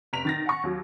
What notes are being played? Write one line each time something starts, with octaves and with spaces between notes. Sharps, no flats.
F1 A#5 B6 D7 F7
D#3 A6 A#6
F#5 G#5 C#6
D#2 F#3